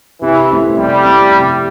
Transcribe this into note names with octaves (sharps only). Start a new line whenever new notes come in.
C3 E3
A3 C4 E4
C3 G3
A3 C4 E4
C3